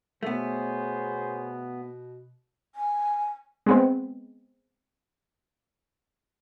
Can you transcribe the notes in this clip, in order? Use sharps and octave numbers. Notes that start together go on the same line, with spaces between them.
B2 A3 B3 G#4 C5 C#5
G#5
G#3 B3 C4